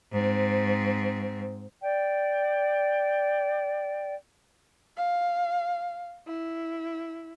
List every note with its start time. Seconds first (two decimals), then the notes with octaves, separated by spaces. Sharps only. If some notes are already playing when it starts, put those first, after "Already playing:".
0.12 G#2 C4
1.80 D5 G5
4.97 F5
6.27 E4